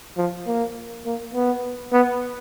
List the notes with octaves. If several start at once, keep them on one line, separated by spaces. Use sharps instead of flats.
F3
A#3
A#3
B3
B3